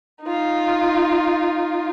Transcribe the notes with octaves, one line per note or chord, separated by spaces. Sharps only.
D#4 F4